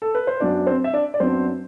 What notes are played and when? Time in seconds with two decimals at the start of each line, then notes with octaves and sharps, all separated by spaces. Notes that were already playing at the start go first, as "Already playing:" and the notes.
0.02 A4
0.15 B4
0.27 C5
0.40 F#2 F#3 B3 D4 D5
0.67 C4 C5
0.84 E5
0.93 D4 D5
1.14 D5
1.20 F#2 F#3 B3 C4 D4 C5